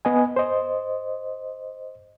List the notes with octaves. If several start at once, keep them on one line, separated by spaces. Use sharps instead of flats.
B3 D#5 G#5
C5 D#5